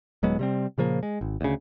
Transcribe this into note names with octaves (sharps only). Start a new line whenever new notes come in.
D#1 F#3 G#3 B3
C3 G3 C4
A#2 C#3 F3 A#3
G#3
G#1
D2 C#3